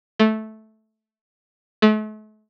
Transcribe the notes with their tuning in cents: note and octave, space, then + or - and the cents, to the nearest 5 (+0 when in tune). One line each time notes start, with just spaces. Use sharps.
A3 -10
A3 -40